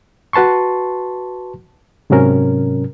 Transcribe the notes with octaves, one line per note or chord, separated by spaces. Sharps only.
F#4 B4 A5 C6 C#6
G#2 C3 F#3 C#4 A#4